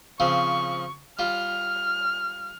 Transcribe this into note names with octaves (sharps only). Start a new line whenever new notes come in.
C#3 F3 C4 C#6
G3 F4 F6